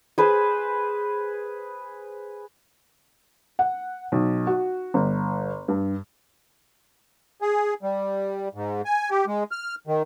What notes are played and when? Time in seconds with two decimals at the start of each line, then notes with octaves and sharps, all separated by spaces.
0.18 G#4 B4 C5
3.59 F#5
4.12 B1
4.47 F#4
4.94 G1
5.68 G2
7.42 G#4
7.83 G3
8.54 G#2
8.85 G#5
9.10 G4
9.27 G#3
9.51 F6
9.87 D#3